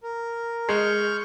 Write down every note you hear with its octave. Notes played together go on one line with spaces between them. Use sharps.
A#4
G#3 C#6 F6 G6